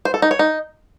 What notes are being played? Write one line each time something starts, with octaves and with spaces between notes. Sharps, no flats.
C5
A4
D#4
C#5
D#4